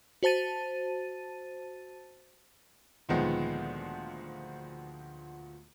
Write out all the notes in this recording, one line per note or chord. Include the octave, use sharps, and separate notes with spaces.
F#4 C5 A5 A6 D#7
D2 A#2 D#3 F3 G#3 B3